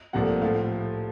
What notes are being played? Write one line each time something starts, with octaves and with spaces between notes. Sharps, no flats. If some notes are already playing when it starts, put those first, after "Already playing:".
C2 A#2 F3 A3 F#5
A2 F3 A3 F5